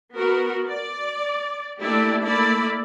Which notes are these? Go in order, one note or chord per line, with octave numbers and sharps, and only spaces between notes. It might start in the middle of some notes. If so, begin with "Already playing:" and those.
B3 F#4 A#4
D5
A3 A#3 D4 E4 G4 D5
A3 A#3 E4 D5 B5